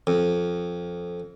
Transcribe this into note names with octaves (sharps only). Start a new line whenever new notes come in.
F2